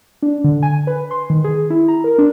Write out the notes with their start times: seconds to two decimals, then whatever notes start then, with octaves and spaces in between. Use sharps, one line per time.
0.22 D4
0.44 D3
0.63 G#5
0.87 B4
1.11 C6
1.30 D#3
1.44 G#4
1.70 E4
1.88 A#5
2.04 A#4
2.18 D4